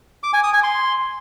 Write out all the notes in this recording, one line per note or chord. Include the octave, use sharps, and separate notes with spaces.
D6
G#5
D#6
G#5
C6